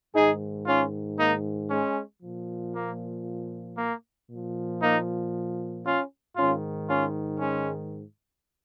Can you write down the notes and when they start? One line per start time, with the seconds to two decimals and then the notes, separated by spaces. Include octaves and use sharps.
0.15 G#2 D#3 D#4 G#4
0.67 C#4 F4
1.19 A#3 D#4
1.70 G#3 C#4
2.22 A#2 F3
2.75 A#3
3.78 A#3
4.30 A#2 F3
4.82 A#3 D#4
5.85 C#4 F4
6.37 G#2 D#3 C#4 F4
6.89 C#4 F4
7.40 G#3 C#4